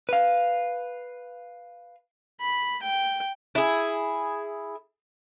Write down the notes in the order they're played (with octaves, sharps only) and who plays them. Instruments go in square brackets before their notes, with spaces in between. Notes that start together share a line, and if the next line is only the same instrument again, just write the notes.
[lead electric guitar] B4 F5
[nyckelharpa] B5
G5
[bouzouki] E4 G#4